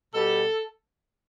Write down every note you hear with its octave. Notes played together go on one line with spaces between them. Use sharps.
B2 G3 A4